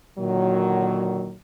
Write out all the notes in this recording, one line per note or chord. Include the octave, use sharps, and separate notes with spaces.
A#2 D3 D#3 F#3